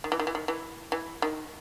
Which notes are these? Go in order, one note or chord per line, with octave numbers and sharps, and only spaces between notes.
D#3
E3
D#3
E3
D#3
E3
E3
D#3